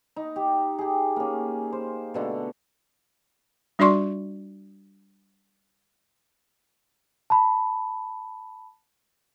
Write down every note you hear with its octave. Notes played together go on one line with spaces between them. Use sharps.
D#4
G4
G4 G#4
A#3 C#4
C5
B2 D3 A3
G3 D4 F#4 D5 C6 C#6
A5 B5